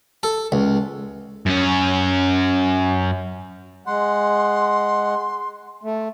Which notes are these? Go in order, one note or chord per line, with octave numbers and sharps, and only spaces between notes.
A4
C#2
F#2 C#4
G#3 F#5 C6
A3